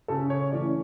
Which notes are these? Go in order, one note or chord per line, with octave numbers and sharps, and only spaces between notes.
C#3 A4
C#5
E3 A3 C#4 D5